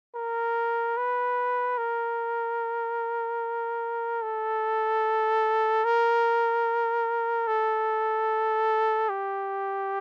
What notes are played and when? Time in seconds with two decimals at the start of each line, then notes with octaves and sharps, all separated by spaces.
0.15 A#4
0.97 B4
1.78 A#4
4.22 A4
5.85 A#4
7.47 A4
9.09 G4